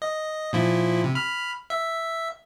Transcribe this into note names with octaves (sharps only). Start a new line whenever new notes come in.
D#5
A#2 F3 E4
C3
B5 F6
E5